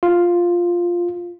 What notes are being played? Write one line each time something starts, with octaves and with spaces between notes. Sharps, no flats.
F4